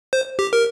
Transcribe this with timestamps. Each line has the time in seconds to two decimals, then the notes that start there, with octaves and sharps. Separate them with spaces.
0.13 C5
0.39 G4
0.53 A#4